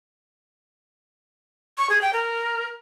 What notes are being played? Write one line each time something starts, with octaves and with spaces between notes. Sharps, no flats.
C#6
G#4
G5
A#4